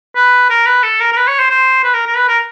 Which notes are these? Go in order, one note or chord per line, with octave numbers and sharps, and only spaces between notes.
B4
A#4
B4
A4
A#4
A#4
B4
C#5
C5
C5
B4
A#4
A#4
B4
A#4